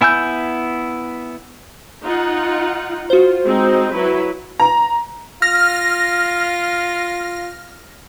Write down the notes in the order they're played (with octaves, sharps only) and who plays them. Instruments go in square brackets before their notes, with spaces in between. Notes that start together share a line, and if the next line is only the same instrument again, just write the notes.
[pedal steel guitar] B3 E4 G#5 E6 G6
[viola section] D#4 F4 F#5
[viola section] F4 [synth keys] F#4 C5
[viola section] G#3 C4 D#4
F#3 E4 B4
[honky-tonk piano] A#5
[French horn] F4 [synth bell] F6 A#6